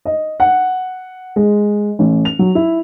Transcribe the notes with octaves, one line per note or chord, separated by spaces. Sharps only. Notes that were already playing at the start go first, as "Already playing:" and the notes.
D#5
F#5
G#3
A1
F7
F#3
E4